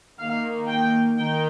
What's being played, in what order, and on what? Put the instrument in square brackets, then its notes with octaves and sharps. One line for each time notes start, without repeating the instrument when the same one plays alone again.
[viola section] D#3 A#3 F5
G5
D#3 G5